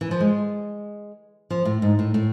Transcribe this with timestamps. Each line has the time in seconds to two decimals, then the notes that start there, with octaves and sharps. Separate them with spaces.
0.01 E3
0.11 F3
0.20 G#3
1.50 F3
1.65 A2
1.82 G#2
1.99 A2
2.14 A2